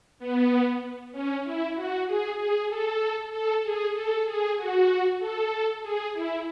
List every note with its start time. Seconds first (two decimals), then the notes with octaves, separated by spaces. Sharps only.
0.19 B3
1.12 C#4
1.44 E4
1.75 F#4
2.06 G#4
2.38 G#4
2.69 A4
3.31 A4
3.63 G#4
3.94 A4
4.26 G#4
4.57 F#4
5.19 A4
5.82 G#4
6.13 E4